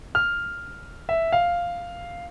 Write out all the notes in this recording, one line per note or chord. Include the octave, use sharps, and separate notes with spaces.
F6
E5
F5